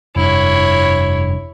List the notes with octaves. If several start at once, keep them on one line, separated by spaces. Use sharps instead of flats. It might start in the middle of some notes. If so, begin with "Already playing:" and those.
F1 G2 E4 C#5